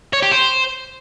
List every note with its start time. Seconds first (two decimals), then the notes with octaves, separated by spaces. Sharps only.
0.13 C#5
0.22 G4
0.32 C5